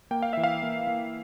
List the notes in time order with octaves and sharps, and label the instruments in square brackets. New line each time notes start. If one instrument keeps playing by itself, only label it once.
[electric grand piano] A#3 G5
F5
E3 E5
F5
A#3
A#3